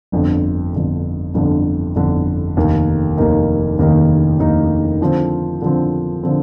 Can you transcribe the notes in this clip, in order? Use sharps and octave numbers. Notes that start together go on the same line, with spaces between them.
G1 F2 D3
G1 F2 D3
G1 F2 D3
G1 F2 D3
F1 D#2 D#3 A#3 D#4
F1 D#2 D#3 A#3 D#4
F1 D#2 D#3 A#3 D#4
F1 D#2 D#3 A#3 D#4
D3 F3 C4
D3 F3 C4
D3 F3 C4